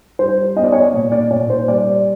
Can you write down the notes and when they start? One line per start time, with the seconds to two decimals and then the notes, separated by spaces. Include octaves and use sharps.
0.19 G3 C5
0.56 B3 D#5
0.64 D5
0.72 C#5
0.80 D5
0.94 A#2
1.12 D5
1.31 A#2 C#5
1.50 C5
1.68 G3 D5